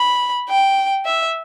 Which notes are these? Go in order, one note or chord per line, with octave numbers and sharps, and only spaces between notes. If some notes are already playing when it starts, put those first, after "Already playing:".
Already playing: B5
G5
E5